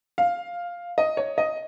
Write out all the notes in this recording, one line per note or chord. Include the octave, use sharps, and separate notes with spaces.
F5
D#5
C#5
D#5